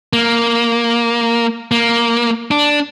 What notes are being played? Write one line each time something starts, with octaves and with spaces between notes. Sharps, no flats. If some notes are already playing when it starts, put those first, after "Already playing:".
A#3
A#3
D4